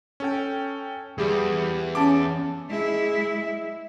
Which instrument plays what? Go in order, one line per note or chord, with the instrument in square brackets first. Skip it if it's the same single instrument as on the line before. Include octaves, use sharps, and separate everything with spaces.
[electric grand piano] C#4 A4 G5
[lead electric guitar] E2 [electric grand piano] G3 G4 G#4
[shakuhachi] C#4 [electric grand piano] A5 D6
[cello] G#3 E4